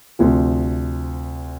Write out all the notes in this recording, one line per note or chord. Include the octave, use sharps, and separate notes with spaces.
D2 C3 F3